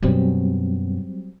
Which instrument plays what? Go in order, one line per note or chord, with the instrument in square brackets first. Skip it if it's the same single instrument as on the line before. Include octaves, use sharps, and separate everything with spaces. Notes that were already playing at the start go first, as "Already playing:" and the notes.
[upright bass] F#2 B2 [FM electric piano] F#3 G3 C4